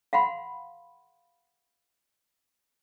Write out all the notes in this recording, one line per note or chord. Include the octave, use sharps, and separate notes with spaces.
F5 F#5 B5 C6